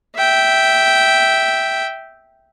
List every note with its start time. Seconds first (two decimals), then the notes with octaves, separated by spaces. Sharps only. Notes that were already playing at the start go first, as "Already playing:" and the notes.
0.16 E5 G5